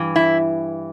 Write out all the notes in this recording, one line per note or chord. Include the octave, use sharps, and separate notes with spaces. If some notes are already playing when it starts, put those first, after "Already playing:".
Already playing: G2 E3
E4